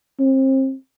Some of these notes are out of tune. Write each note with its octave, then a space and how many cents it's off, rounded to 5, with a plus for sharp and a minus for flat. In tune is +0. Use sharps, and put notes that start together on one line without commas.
C4 +30